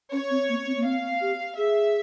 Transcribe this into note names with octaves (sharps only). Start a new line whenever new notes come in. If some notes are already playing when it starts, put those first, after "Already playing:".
C#4 C#5
C4
A#3
C4
A#3
C4 F5
G4
G#4 E5